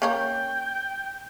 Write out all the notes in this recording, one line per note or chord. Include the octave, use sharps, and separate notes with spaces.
A#3 C#4 A#4 G5